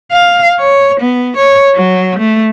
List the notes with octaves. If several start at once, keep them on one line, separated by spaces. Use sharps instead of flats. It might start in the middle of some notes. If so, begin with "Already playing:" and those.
F5
C#5
B3
C#5
F#3
A3